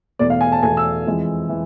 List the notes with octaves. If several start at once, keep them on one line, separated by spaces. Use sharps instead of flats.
E2 B2 A3 D5
F5
G#5
A5
E2 B2 A3 G#5
E6
F2 E3 G#3 C4
E3